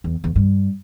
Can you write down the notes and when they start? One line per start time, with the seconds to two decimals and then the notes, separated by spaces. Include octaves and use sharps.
0.04 E2
0.24 E2
0.36 G2